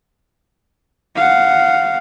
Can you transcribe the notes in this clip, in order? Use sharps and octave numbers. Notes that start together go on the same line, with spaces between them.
F5 F#5